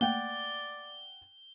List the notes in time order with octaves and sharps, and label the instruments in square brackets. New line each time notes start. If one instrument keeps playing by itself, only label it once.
[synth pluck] A3 A#3 [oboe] D5 [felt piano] F#5 G5 [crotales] G7